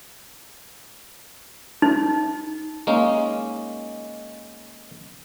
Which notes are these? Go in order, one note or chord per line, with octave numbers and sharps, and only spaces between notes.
D#4
G#3 A#3 C#4 D#4